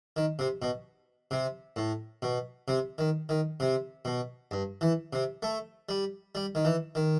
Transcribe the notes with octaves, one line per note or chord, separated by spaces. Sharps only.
D#3
C3
B2
C3
A2
B2
C3
D#3
D#3
C3
B2
G2
E3
C3
A3
G3
G3
D#3
E3
D#3